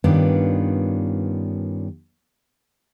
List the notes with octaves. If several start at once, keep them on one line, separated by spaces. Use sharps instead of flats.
G2 D#3 B3 C#4 D4 F4